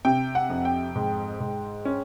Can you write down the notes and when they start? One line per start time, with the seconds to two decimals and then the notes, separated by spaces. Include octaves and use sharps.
0.05 C3 G5
0.35 F#5
0.50 F2
0.65 G5
0.95 G#2
1.40 G#2
1.85 C#4